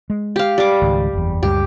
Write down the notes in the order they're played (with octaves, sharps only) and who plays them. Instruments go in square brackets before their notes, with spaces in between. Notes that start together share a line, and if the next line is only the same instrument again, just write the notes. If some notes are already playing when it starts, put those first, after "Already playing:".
[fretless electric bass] G#3
[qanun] G4 F5
G3 D6
[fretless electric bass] C#2 G#2 D#3
F#1 E2
[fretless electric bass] C#2 F#2 G3 [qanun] G4